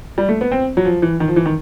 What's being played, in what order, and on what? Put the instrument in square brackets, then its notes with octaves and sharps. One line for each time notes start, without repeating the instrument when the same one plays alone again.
[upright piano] G3
A3
B3
C4
F#3
F3
E3
D#3
F3
E3
D#3